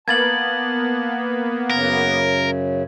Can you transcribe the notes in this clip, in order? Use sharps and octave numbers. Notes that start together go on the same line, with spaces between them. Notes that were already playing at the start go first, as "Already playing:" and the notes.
A#3 B3 A5 G#6 A6 F#7
F#2 C#3 A#4